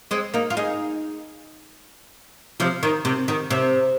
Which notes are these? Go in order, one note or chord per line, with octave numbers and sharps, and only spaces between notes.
G#3 C4
A#3 D#4
F4
D#4 G#4
C3 F3
D#3
C3
D#3
C3